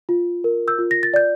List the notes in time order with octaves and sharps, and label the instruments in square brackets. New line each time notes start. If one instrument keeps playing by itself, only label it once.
[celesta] F4
A#4
E6 G6
F4
A#6
A6
D5 G6